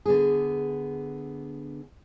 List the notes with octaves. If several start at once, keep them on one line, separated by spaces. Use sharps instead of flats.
D3 B3 G#4